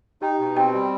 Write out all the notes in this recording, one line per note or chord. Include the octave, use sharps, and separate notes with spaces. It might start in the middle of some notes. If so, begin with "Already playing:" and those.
D#4 G4 G5
B2
C4 G4 G5
G3